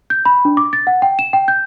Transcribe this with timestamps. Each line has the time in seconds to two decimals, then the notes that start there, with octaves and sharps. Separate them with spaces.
0.10 G6
0.25 B5
0.45 D4
0.57 D6
0.73 A6
0.87 F#5
1.02 G5
1.19 E7
1.33 G5
1.48 G6